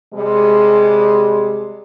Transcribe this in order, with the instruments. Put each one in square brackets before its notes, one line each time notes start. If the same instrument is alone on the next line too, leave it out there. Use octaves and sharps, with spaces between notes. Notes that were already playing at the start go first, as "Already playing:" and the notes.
[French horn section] C3 G3 G#3